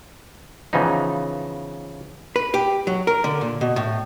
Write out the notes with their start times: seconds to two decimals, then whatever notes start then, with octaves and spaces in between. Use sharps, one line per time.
0.73 C#3 E3 F3 B3 D#4
2.36 B4
2.54 G4
2.87 F#3
3.07 A#4
3.24 D3
3.41 A#2
3.61 B2
3.76 A2